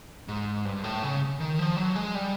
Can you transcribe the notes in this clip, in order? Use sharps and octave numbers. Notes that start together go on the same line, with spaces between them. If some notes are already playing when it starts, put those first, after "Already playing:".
G#2
G2
A2
C#3
D#3
F3
F#3
G#3
G3